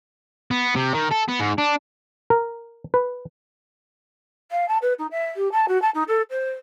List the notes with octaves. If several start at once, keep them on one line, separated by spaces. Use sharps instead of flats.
B3
C3
D#3
A4
B3
G#2
D4
A#4
B4
F5
A5
B4
D#4
E5
G4
A5
F#4
A5
D#4
A4
C5